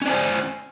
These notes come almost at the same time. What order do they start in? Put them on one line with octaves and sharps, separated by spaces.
C#4 D5 C5